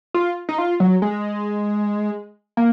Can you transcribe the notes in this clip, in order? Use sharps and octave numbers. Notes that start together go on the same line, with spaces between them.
F4
D#4
F4
F#3
G#3
A#3